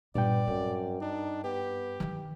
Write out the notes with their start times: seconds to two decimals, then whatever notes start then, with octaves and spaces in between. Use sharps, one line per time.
0.15 G2 A#2 B3 D5 G5
0.47 F#2 C4
1.01 D4 D#4
1.44 B3 G4
2.00 D#3 E3